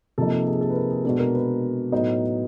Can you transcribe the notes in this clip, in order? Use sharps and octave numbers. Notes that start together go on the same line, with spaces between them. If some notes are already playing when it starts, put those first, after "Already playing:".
C3 F3 A#3 D#4 A4
A4
G#4
A4
B4
A#4
G#4
B2 G#3 B3 D4 A4
A#4
B4
A2 F#3 B3 D#4